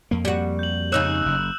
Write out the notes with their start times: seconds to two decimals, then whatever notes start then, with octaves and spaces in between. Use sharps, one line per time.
0.11 F2 A#3
0.25 G3 F#4
0.59 G6 F#7
0.92 C#3 D#4 C#5 E6 F#6 E7
1.26 F#1